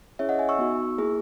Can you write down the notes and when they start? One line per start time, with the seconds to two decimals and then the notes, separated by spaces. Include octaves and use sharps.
0.19 C#4 E4 G#4 C#5 E5
0.29 D#5 F#5
0.39 E5 G#5
0.49 C#6 E6
0.59 B3 D#4 F#4
0.98 A#3 E4 G#4